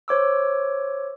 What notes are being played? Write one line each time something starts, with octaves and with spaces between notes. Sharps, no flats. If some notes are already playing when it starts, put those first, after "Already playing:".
C5 C#5 D6 E6